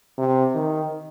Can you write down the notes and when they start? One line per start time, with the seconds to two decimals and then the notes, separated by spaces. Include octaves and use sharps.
0.18 C3
0.55 D#3